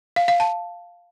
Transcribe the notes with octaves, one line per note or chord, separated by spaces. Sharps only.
F5
F5
A5